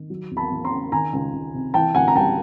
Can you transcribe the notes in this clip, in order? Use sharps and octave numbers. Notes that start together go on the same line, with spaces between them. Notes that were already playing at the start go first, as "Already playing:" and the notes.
Already playing: D#3
F#3
E2
A5 B5
E2
A#5 C6
C#3
D#3 G#5 A#5
C#2
C#2
C3
E3 G5 A5
D2 F#5 G#5
A#5
G3 G5 A5